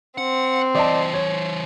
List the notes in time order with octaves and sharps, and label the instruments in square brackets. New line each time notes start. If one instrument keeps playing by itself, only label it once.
[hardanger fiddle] C4 [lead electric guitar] F#5
[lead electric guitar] E3 C5 [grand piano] D5 D#5 A5
[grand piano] C#5